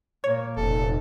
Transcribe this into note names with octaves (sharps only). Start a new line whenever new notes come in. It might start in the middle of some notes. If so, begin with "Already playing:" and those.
A#2 A#3 C#5
F1 A#2 A4